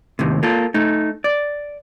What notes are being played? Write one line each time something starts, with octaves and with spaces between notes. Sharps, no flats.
D#2 A2 C3
A#3 F4 A4
A3 D#4
D5